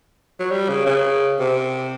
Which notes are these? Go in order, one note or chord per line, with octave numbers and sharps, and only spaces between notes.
F#3
G3
C#3
C#3
C3